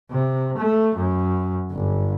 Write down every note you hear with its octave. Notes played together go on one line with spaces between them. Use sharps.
C3
A3
F#2
G1